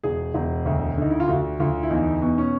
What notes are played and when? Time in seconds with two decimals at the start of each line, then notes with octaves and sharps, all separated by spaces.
0.03 E1 G#4
0.34 E1
0.65 D2
0.97 D3 D#4
1.10 E4
1.20 F4
1.28 D2 F#4
1.60 D2 F4
1.83 E4
1.90 E2 D#4
2.22 B2
2.38 C#4